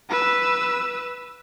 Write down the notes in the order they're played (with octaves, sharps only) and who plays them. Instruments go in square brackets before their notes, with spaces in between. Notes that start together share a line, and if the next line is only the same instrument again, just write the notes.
[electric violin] B4 E6